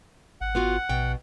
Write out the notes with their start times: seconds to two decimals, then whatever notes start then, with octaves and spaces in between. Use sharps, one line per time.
0.41 G#1 F#5
0.55 B3 F4 F#4
0.89 A#1 B2 G5